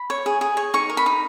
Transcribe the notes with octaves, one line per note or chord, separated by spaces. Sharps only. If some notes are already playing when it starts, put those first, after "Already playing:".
Already playing: B5
C#5
G#4
G#4
C#5
D#4 C#6
A#4
B5
D#4